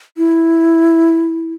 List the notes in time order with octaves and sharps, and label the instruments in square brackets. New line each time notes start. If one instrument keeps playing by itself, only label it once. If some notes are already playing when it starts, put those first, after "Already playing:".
[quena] E4